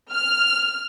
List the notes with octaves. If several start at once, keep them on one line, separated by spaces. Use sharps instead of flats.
F6